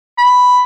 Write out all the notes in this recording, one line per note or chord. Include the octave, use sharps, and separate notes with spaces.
B5